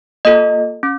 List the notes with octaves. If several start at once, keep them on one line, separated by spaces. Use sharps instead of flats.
A#3 F4 A4 D#5
C#4